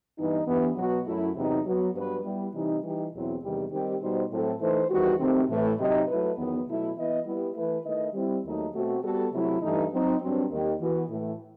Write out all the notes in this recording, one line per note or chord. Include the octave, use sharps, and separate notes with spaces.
G2 E3 B3 D#4
G2 E3 B3
B2 F#3 B3 F#4
F#2 F#3 A3 E4
E2 C3 F#3 B3 D#4
F#3 B3 F#4
G2 F#3 B3 F#4 B4
G3 B3 E4
C3 E3 G3 D#4
E3 G3 D#4 G4
E2 B2 F#3 C4 E4
E2 C3 D#3 G3
D#3 G3 C4 D#4 G4
B2 G3 D#4 F#4 C5
A2 F#3 C4 E4 A4
E3 A3 D#4 A4 C5
E2 D#3 G3 B3 F#4
C3 D#3 A3 C4
A2 E3 A3
C3 F#3 C4 D#4
F#3 A3 E4 B4
E2 D#3 F#3 B3
B2 F#3 A3 E4
E3 B3 E4 B4 D#5
G3 B3 E4
E3 A3 E4 B4
D#3 A3 E4 B4 D#5
G3 C4 E4
D#2 D#3 F#3 A3 D#4
B2 A3 C4 F#4
G3 B3 F#4 A4
C3 F#3 A3 E4
G2 E3 A3 D#4
F#3 C4 D#4
G2 F#3 C4
D#2 D#3 G3
E3 B3 F#4
A2 E3 A3